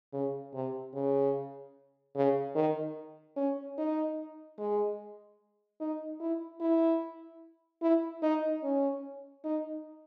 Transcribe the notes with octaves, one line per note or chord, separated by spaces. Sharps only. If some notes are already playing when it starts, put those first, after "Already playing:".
C#3
C3
C#3
C#3
D#3
C#4
D#4
G#3
D#4
E4
E4
E4
D#4
C#4
D#4